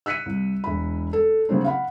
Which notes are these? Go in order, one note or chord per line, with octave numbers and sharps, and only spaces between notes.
E6 F#6 B6 C#7 D#7
C2
E1 B5
A4
C#3 F#3 A#3 C4 D4
F5 F#5 B5